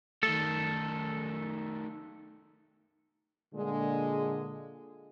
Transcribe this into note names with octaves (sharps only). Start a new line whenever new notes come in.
D#3 A3 A4
A#2 D3 G#3